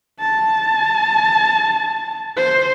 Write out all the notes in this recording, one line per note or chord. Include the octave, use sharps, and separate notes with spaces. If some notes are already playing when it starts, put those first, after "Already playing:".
A5
C5